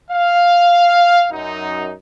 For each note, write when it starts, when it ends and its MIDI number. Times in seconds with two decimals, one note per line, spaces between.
0.11 1.26 77
1.32 1.92 42
1.32 1.92 63